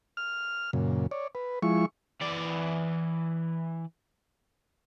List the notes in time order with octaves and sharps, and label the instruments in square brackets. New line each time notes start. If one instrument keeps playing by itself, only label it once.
[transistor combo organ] F6
F#2 A#2 C#3
C#5 D5
B4
F3 G#3 E4 C#6
[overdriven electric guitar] E3 D5